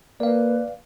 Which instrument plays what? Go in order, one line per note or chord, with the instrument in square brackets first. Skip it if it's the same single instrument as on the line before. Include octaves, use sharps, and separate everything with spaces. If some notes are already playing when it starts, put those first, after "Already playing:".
[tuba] A#3 [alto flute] B4 [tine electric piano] D5 F5